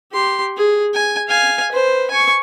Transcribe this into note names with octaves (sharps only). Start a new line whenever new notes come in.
G4 C6
G#4
G#5
F5 G#5
B4 C5
G#5 C#6